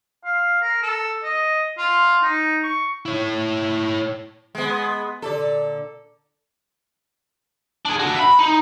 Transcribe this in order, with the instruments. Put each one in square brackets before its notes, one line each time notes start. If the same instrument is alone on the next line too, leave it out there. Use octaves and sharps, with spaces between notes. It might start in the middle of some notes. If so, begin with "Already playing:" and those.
[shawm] F5
A#4
A4
D#5
F4
D#4
C#6
[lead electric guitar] E4 C#5
[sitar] G#3 B3
[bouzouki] A#2 D3 D5 [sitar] A4
[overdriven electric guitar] D4 G#4
D4 F#4
E5 B5
D#4